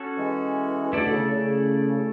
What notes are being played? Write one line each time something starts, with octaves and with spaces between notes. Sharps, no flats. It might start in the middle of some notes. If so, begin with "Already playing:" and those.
Already playing: C#4 F#4 A4
E3 G#3
B2 D3 A3 E4 A4 D5
B2
C#3
C#3
C#3